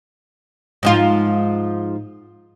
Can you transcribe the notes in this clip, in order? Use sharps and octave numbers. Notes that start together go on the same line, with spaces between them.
G#2 F3 F4